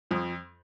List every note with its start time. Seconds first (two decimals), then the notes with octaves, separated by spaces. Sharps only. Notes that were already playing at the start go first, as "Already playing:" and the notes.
0.11 F2 F3